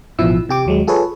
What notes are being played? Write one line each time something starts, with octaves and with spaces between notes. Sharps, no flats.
A1 B2 F3 E4 E6
C3 G4 D6
D#2 F#3 G#3
F4 G#4 A4 B4 C#5